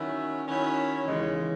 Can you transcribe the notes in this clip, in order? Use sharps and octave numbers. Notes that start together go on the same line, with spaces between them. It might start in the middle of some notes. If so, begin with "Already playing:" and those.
Already playing: D#3 F#3 C#4 E4
D#3 F#3 C#4 E4
D#2 C#3 E3 G#3